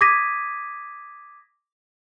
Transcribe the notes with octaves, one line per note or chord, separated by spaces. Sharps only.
D6 D#6 G#6 A#6 B6 D#7